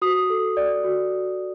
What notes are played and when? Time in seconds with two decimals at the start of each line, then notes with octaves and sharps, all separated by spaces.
0.02 F#4 D#6
0.30 A4
0.57 D5
0.84 F#4
1.12 F#4